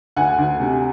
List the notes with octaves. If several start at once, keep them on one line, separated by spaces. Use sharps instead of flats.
D2 F#5 G#5
D2
C3